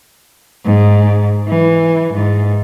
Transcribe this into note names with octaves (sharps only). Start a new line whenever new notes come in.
G#2
E3
G#2